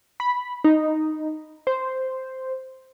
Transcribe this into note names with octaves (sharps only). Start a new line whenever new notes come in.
B5
D#4
C5